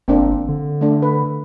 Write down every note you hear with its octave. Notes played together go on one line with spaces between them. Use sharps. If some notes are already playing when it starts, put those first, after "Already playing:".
G1 A#3 C4 D4
D3
A3 D4
B4